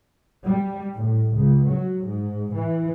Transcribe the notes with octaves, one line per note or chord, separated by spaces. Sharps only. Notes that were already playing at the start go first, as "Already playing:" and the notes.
G3
A2
C#2
F#3
G#2
E3